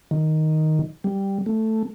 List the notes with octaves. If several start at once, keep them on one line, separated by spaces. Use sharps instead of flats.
D#3
G3
A3